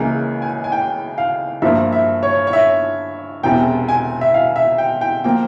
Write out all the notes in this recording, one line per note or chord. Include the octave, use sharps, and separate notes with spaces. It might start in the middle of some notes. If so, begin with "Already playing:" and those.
Already playing: C#2 C#3 E3 A#3 G#5
G#5
G#5
G5
F5
G2 F3 A#3 E5
E5
C#5
C#5
E5
E1 E2 C3 G5
G#5
E5
F5
E5
G5
G5
F3 A#3 G5